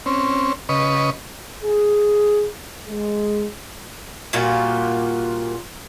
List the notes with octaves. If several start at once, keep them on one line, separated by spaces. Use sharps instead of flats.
C4 C#4
C#3 B4 D#5 C#6
G#4
G#3
A#2 G3 F4 F#4